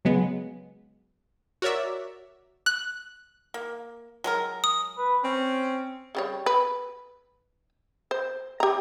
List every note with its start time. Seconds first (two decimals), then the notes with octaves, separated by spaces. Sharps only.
0.05 C#3 F#3 G#3 B3
1.62 F#4 A#4 C#5 D5 E5
2.66 F#6
3.54 A#3
4.24 F#3 G#3 A#4
4.64 D#6
4.98 B4
5.24 C4 C#4
6.15 C#3 G3 C#5
6.46 B4
8.11 C5
8.60 G4 A#5